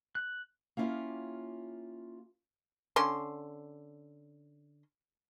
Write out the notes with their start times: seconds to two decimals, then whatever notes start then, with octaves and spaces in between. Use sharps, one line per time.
0.15 F#6
0.77 A#3 C#4 E4 F4 G4 F5
2.96 D3 C#4 C6